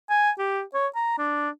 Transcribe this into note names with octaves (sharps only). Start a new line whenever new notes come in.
G#5
G4
C#5
A#5
D4